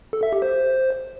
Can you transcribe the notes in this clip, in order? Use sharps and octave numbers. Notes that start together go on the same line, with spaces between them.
A4
E5
G4
C5